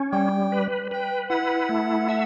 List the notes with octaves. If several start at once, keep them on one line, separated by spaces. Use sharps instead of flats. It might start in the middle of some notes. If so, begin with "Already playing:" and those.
Already playing: C#4
G3 G5
B4
B4 G5
E4 F#5
A3
E5